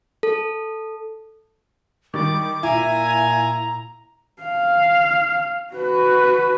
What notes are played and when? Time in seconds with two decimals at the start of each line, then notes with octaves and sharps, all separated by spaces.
0.23 A4
2.14 D#3 G3 D6 A6
2.63 A#2 E4 E5 G#5 A#5
4.42 F5
5.74 F#4 B4